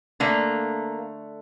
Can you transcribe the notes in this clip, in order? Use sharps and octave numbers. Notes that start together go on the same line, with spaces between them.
D3 A3 A#3